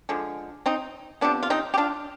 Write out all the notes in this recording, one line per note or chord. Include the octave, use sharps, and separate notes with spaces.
D3 F3 G#3
C4 D#4
C3 F3 B3 D4
F4
C4 D#4
G4
D4 F4